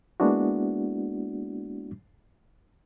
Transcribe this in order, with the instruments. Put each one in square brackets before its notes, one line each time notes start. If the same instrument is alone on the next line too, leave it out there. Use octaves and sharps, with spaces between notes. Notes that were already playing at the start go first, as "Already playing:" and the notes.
[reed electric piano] G#3 A#3 B3 D4 E4 F#4